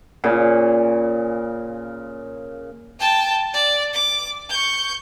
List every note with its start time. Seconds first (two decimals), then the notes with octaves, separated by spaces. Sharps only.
0.24 A#2 C#3
2.99 G5 A5
3.54 D5
3.93 D6
4.50 C#6 G6